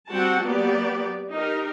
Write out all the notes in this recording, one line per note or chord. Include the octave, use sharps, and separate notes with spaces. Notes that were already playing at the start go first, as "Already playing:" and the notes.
G3 C4 F#4 F#5 G5 A5
F#3 A#3 B3 G4 D5
D#4 G4 A#4